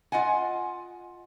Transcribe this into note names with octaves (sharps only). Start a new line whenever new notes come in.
F4 D#5 F#5 G#5